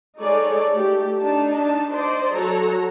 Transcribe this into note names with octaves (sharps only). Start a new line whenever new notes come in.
G#3 D#4 G#4 A4 C#5 D5
A3 G4
D4 D#4 A5
C5 D5 D#5
F#3 F#4 A4 C#5 A#5